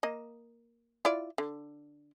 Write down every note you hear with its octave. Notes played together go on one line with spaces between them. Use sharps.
A#3 D#5
E4 F4 D5
D3